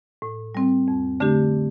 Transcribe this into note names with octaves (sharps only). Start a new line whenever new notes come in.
A2
G3 C4
F2
D3 A3 D4 G4